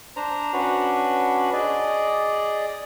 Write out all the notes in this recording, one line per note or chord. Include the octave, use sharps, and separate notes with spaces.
D4 C5 A#5
C#4 D4 F#4 B4
G#4 D5 D#5